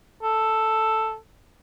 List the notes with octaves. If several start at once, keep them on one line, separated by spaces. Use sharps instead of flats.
A4